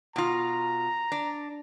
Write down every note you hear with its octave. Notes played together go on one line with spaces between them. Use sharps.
B2 F4 A#5
D4